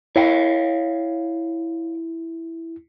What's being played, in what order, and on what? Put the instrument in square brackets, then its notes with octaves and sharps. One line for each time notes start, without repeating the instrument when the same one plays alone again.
[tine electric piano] E4 [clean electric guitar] C#5 F5 G5